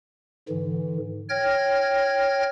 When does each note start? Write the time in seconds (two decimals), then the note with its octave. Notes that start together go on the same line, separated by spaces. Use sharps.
0.49 G#2 D3 E3
1.29 C#5 G5 F6 G#6 A#6